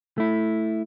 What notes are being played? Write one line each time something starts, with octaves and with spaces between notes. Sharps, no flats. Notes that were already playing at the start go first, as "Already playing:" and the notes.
A3 E4